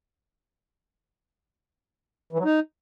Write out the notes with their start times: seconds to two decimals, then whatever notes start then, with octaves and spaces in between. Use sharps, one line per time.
2.33 E3
2.39 F#3
2.45 D#4